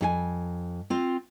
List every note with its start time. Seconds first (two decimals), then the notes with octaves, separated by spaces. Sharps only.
0.01 F2 G4 G#5
0.90 C4 F4